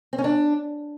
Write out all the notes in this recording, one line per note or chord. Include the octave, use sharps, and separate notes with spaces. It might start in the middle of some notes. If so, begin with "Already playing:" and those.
C4
C#4
D4